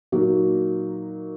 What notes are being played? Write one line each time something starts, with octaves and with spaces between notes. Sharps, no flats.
A#2 F#3 A#3 D#4 F#4